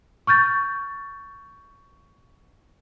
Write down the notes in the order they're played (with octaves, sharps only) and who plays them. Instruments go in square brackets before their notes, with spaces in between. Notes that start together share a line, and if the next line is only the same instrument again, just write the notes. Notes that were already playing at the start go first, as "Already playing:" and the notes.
[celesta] C#6 F6 G6 A6